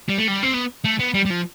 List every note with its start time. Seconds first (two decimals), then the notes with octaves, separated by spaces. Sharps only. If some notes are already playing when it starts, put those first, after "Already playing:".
0.09 G3
0.18 A3
0.28 G3
0.43 C4
0.54 B3
0.85 A3
1.00 B3
1.15 G3
1.25 G3
1.31 F3